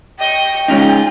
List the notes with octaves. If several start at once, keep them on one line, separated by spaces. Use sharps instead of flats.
D#5 G5 C#6
G#3 C#4 D#4 F4 G#4